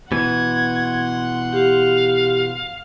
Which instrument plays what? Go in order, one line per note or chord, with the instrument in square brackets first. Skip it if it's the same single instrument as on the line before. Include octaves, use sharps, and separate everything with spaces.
[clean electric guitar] B2 E3 [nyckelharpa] F#5 C6 [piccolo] G#6
[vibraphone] G4 [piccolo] F5